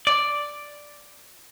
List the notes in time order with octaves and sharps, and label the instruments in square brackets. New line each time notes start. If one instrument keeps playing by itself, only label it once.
[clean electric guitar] D5